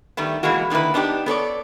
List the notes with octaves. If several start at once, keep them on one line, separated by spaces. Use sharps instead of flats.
D#3 G3 A3 B3
B2 E3 G#3 A#3 F#4
D3 D#3 A#3 E4 B4
B3 D4 D#4 F4 G4
B3 A4 C#5 D5